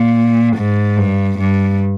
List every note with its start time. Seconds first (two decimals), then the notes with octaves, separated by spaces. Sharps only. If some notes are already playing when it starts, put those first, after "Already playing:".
Already playing: A#2
0.57 G#2
0.97 G2
1.39 G2